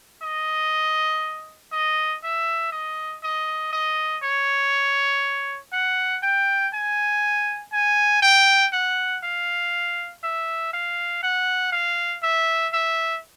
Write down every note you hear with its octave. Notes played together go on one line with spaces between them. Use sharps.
D#5
D#5
E5
D#5
D#5
D#5
C#5
F#5
G5
G#5
G#5
G5
F#5
F5
E5
F5
F#5
F5
E5
E5